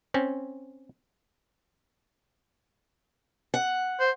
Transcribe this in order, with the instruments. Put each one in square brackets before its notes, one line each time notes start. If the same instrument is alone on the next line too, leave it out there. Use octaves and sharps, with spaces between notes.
[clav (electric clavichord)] C4 C#4
[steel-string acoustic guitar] F#5
[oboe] C5